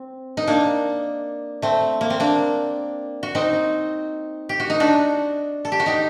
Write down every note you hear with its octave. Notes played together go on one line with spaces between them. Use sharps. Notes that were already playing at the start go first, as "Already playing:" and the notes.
Already playing: C4
D#4
A#3 D4
A3 C4
A#3
C4
A#3 D4
F#4
C4 D#4
G4
F#4
D#4
D4 F#4
A4
G4
F#4
D#4 G4